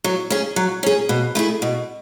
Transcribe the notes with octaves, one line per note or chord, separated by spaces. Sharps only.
F#3
C#4 G#4
F#3
C#4 G#4
B2
A3 E4 G#4
B2